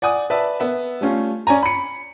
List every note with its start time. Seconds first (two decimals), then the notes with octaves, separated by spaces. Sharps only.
0.02 D5 F#5 G#5 D#6
0.30 B4 D5 E5 A5
0.60 B3 E5
1.01 G3 A3 C#4 F4
1.47 C#4 D5 G#5 A#5
1.63 B5 C#7